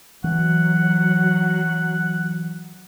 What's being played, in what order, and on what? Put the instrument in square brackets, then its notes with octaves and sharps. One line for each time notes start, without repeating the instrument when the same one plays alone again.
[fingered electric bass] E3 [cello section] F#3 [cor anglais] F#5